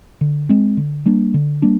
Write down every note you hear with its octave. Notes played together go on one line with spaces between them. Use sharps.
D3
G#3 C4
D3
G3 A#3 D4
D3
G3 A#3 D4